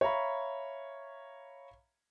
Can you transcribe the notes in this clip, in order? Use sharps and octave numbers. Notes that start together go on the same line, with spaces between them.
C#5 E5 F5 A#5 B5